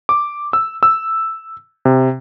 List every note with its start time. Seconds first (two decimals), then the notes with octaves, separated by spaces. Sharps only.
0.09 D6
0.53 E6
0.83 E6
1.85 C3